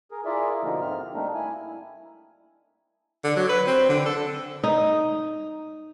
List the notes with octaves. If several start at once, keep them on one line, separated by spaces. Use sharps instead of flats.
G#4 A#4
E4 F4 G#4 A#4 D5 E5
B2 D3 F3 A#3 D#4
G#2 C4 F6
G3 A3 A#3 C4 D4 D#4
E4 G#5
D3
F#3
B4
C4
D3
A4
D#4